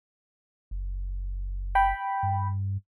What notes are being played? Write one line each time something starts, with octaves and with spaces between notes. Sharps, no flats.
F#1
G5 B5
G2